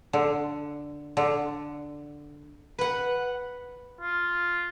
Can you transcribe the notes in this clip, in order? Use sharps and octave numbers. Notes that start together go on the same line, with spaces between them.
D3
D3
B4 F#5
F4